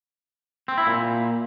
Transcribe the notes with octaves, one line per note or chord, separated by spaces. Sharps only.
C4
E4
A#2